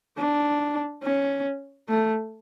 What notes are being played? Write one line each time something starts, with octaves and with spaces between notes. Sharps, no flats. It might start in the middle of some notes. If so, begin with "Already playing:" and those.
D4
C#4
A3